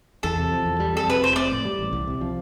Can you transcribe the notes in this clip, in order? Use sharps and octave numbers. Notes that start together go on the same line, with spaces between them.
E2 A4
C3
F3
E2
G3
F2 A4
C3 B4
F1 C5
C4 D5
A2
G3
A1
C2
C3
F3